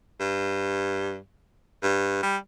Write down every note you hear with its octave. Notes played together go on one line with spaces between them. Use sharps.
G2
G2
G3